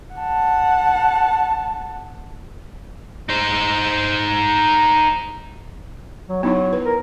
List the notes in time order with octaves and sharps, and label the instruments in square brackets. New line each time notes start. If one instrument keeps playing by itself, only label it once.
[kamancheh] F#5 A5
[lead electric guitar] D#4 C5
[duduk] F#3
[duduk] F#3 [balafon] B3 D#4 E4
[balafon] B4
[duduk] A#4